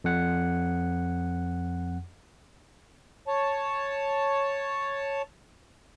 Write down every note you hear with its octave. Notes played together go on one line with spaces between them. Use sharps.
F2 F#5
C#5 A5